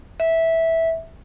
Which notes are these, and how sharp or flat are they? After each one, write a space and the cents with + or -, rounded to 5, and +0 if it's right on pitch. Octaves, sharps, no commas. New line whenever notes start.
E5 -10